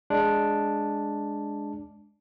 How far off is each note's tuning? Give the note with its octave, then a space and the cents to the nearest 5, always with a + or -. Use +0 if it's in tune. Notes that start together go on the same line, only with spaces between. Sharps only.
G#3 +0 D4 +0